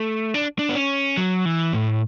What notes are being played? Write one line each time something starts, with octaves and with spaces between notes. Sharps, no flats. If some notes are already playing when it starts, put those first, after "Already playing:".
Already playing: A3
D4
D4
B3
C#4
F#3
E3
A2